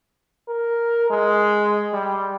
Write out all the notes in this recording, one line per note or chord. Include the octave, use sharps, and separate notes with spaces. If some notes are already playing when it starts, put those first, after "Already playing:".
A#4
G#3
G3